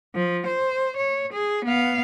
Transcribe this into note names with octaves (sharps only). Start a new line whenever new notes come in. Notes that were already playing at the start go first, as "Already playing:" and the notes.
F3
C5
C#5
G#4
B3 F5